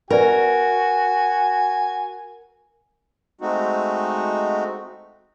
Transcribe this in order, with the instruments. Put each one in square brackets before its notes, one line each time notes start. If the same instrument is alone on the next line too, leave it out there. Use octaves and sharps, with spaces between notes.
[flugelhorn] F#4 [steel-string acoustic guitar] A#4 [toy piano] B4 D5 [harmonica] G#5
[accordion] G#3 A3 C4 D#4 F#4